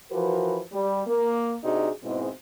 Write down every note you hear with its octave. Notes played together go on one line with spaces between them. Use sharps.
E3 F3 F#4 A#4 B4
G3
A#3
C3 D4 D#4 F#4 G#4
G#2 B2 G#3 C4 E4